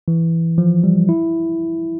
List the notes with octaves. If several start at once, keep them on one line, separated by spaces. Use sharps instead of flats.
E3
F3
G3
E4